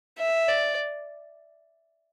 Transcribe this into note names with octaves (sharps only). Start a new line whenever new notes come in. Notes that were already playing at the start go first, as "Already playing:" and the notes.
E5
D5